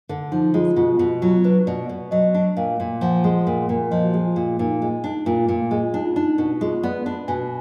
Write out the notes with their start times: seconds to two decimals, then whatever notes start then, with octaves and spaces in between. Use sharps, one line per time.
0.09 D3
0.32 F3 D#4
0.54 G#3 F4
0.76 B2 F4
0.99 B2
1.22 F#3 F4
1.44 D4 B4
1.67 B2 D5
1.89 B2
2.11 F#3 D#5
2.34 D4
2.57 A#2 F5
2.80 A#2
3.01 F3 F#5
3.24 G#3
3.47 A#2
3.69 A#2
3.91 F3 D#5
4.03 F#4
4.14 G#3 F4
4.25 F4
4.36 A#2 F4
4.59 A#2 D#4
4.81 G#3 F4
5.04 D4 D#4
5.26 A#2 F4
5.48 A#2
5.71 G#3
5.82 F4
5.93 D4 D#4
6.05 F4
6.16 D4 D#4
6.38 B2
6.61 G#3 F4
6.83 B3 D5
7.06 D4
7.28 B2 G#5